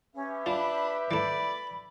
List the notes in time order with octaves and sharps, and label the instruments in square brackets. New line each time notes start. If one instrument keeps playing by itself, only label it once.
[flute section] C#4 [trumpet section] G4 B4 E5
[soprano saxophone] D4 [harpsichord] F4 [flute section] B5
[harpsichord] E3 A3 [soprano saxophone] D5 [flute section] B5